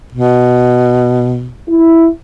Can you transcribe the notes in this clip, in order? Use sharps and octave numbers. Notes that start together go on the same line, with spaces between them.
B2
E4